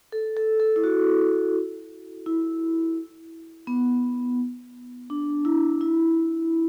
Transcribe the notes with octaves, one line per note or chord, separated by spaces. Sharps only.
A4
A4
A4
E4
F#4
E4
B3
D4
E4
E4